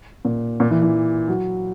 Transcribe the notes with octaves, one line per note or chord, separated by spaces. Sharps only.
A#2
A#2
E3
E3
F#3